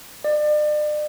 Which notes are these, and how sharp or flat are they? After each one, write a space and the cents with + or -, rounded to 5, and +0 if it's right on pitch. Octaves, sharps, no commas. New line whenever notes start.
D5 +40